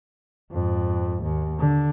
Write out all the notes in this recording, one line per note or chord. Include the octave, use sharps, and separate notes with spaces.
F2 G#2
D#2
D3